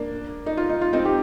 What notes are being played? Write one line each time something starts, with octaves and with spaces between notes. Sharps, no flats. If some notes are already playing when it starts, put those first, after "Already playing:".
Already playing: A#3 D4
D#4
F4
D#4
F4
C4 D#4
G4